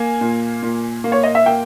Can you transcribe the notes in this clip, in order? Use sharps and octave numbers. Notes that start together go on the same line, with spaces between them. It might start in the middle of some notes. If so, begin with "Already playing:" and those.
Already playing: A#3 G#5
A#2
A#2
A#3
C#5
D#5
E5
A#3 G5